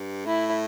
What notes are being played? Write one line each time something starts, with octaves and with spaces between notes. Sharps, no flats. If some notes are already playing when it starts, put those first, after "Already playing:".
Already playing: G2
A2 E4